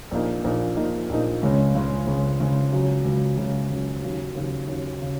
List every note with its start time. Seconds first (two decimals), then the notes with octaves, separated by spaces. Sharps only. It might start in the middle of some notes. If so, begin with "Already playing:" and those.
0.11 A#1 A#2 A#3 D#4
0.44 A#1 A#2 A#3 D#4
0.76 A#1 A#2 A#3 D#4
1.10 A#1 A#2 A#3 D#4
1.43 C#2 C#3 G#3 C#4
1.75 C#2 C#3 G#3 C#4
2.06 C#2 C#3 G#3 C#4
2.40 C#2 C#3 G#3 C#4
2.72 C#2 C#3 F#3
3.05 C#2 C#3 F#3
3.37 C#2 C#3 F#3
3.69 C#2 C#3 F#3
4.02 D#2 C#3 F#3
4.35 D#2 C#3 F#3
4.67 D#2 C#3 F#3
5.02 C#3